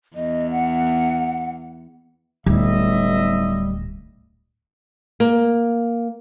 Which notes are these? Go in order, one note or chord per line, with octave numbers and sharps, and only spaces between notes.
E2 D#5
F#5
D1 B1 G3 D#5 E5
A#3